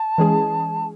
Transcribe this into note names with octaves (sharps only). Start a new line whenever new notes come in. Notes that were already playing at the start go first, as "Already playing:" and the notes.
Already playing: A5
E3 G#3 C#4 G#4